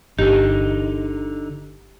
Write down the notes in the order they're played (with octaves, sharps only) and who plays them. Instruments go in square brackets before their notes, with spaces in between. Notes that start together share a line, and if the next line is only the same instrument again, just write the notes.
[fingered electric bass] G1 [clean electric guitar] D3 D#4 [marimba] G4